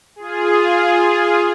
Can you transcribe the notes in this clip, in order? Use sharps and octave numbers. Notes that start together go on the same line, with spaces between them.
F4 G#4